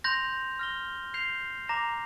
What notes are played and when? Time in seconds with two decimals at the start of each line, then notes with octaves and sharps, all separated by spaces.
0.04 C6 G6 A#6 F7
0.59 F6 A#6 G7
1.14 G6 C7 F7
1.68 A#5 D6 A#6 F7